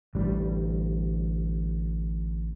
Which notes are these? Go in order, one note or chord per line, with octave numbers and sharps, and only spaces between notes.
A1 D2 G3